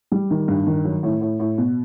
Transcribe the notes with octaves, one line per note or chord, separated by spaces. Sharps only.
G3
D#3
G2
D#3
F#3
A2
A2
A2
B2